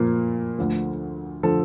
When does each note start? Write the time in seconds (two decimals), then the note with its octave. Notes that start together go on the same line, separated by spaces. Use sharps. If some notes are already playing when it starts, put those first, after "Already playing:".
Already playing: A#2 F3 A#3
0.59 D2 D3 F3
1.43 D3 F3 A4